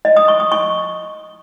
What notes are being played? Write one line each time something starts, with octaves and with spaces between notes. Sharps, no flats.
D#5
D#6
C#6
D#6
C#6